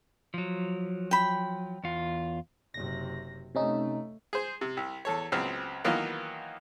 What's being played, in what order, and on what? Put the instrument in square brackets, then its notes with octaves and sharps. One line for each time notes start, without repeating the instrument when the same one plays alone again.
[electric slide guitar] F3 F#3
[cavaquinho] G5 B5
[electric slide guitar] E2 F4
[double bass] F#1 C3 [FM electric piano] A#6
[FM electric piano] C3 C#4 D#4 [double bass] A3
[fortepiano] G#4 C5
C3
C2
E2 A4 C#5
C#2 F#3 B3 C4 F6
D#3 E3 F#3 A#3 B3 F4